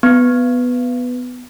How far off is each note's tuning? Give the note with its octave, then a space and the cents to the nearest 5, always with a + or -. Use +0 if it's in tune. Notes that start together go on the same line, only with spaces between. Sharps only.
B3 +5